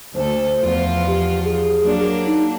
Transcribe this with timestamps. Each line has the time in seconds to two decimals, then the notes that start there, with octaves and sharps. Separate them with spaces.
0.15 D2 A4 C5
0.61 E2 F3 F4
1.07 G4
1.44 G#4
1.81 F#3 A#3 D4
2.26 D#4